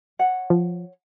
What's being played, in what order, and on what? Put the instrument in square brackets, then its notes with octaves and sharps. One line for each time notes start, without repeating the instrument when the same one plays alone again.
[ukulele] C#5 F#5
[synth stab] F3